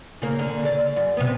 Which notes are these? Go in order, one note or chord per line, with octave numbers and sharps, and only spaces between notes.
C#3 A#3
D3
C#3 D5
F#2
C3 B3